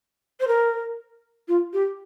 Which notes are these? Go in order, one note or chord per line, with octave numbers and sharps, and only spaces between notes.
C5
A#4
F4
G4